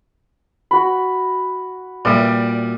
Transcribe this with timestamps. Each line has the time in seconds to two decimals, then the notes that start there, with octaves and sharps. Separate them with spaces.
0.71 F#4 B5
2.05 A#2 G3 D5 E5